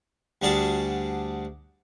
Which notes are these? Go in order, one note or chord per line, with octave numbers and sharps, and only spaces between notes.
D2 G3 D4 F#4 G#4 A5